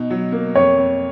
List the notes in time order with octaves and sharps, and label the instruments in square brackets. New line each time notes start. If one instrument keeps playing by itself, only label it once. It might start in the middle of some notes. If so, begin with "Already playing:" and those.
Already playing: [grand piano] B2 D#4
F#3
A#3
[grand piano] F2 [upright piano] C#5
[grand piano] F2